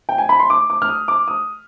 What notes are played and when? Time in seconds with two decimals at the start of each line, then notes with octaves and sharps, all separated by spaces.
0.09 G5
0.18 G#5
0.29 B5
0.39 C6
0.50 D6
0.70 D6
0.82 F6
0.89 D#6
1.08 D6
1.28 D#6